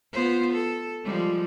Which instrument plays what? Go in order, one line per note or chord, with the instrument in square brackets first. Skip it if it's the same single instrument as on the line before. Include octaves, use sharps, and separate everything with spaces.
[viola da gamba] B3 F4 C5
A4
F3 G3 G#3